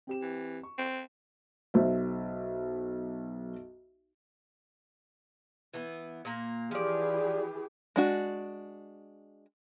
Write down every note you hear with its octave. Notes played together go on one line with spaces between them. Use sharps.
C4 G4 E7
E3
C#6
C4
B1 C5 E5
E3 B3
A#2 A#3
E3 F3 G4 G#4 D5
G#3 D4 F#4